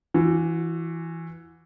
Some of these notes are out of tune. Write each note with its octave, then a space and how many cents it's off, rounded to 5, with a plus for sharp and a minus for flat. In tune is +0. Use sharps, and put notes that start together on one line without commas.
E3 +5 F#4 -30